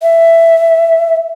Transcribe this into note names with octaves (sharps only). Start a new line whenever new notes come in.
E5